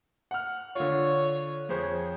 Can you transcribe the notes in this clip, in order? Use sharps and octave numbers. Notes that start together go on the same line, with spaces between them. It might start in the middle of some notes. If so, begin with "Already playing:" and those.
F#5 F6
D3 F4 C#5
F2 G#4 C5 C#5